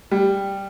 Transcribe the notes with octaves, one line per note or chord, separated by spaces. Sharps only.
G3